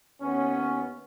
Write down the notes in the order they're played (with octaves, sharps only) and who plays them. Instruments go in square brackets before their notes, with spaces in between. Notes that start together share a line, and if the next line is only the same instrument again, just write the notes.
[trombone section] D#2 B3 C#4